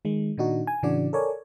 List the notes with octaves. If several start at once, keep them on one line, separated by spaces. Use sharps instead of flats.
D#3 G#3
A#2 D#3 D4 D#4 F#4
G#5
A2 C#3 E3 D4 F#4 D5
A4 A#4 C#5 D5 G#5